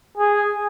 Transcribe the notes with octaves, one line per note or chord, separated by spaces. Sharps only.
G#4